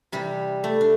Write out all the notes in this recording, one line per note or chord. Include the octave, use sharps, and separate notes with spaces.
C3 E3 G3
A3
D4